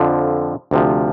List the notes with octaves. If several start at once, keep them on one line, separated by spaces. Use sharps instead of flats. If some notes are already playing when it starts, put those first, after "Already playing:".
Already playing: F2 D3 F3
D2 C3 F3